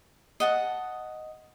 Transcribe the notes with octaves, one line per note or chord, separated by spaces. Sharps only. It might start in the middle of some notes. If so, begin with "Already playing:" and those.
D#5 F#5 A5